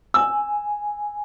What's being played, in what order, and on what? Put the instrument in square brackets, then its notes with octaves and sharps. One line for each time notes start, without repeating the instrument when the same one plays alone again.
[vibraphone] G#5 [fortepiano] E6